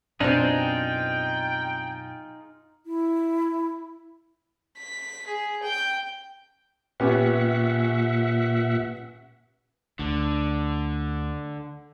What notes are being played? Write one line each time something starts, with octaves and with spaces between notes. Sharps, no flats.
F#2 B2 C4 D4 D#4 F4 G#4 G5
E4
B6
G#4
G5
A#2 B3 C#4 G4 E5 F#5
D2 D3